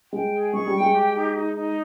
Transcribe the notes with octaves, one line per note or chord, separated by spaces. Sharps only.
G#3 G5
G#4
G#3 C#6
G3
G5
G#3
G4
D#4
D#4
D#4